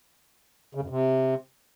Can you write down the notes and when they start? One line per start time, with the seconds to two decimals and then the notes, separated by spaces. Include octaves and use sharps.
0.75 C#3
0.82 F#2
0.90 C3